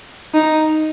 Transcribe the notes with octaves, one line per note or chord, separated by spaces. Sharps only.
D#4